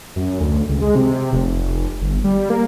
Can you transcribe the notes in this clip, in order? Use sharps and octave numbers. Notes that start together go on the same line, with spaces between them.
F#2
D2
C#2
G#3
C3
F1
G1
G3
A#3